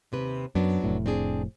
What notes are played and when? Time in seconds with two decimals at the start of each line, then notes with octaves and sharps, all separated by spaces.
0.12 D#2 C3 B4
0.55 F#2 F#3 B3 D4
0.84 F1 A2
1.06 C4 D4 G#4